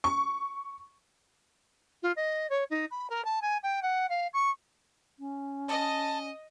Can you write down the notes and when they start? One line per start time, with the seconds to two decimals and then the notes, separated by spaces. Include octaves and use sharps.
0.04 C#6
2.02 F4
2.16 D#5
2.50 C#5
2.70 D#4
2.91 B5
3.10 A#4
3.24 A5
3.41 G#5
3.63 G5
3.82 F#5
4.09 F5
4.33 C#6
5.19 C#4
5.69 D#5 A5